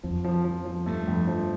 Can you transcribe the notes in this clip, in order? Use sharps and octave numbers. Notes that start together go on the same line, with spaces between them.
F2 F3
F3
F3
F3
G2 A3
F2
F3